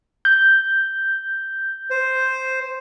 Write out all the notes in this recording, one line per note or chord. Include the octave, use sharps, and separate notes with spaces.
G6
C5